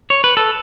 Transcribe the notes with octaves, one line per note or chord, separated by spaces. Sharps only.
C#5
B4
A4